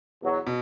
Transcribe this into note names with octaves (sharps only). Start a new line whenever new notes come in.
E2 B2 F#3
B2